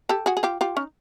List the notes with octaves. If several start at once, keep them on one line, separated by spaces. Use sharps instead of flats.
G4 A4
F#4 G#4
G#4
F4 G4
F4 G4
C#4 D#4